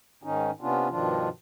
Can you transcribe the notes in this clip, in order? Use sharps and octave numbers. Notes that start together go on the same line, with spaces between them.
G#2 D#3 C#4 D#4
C3 B3 C#4 D4 F4
G2 B2 D#3 F3 D4 F4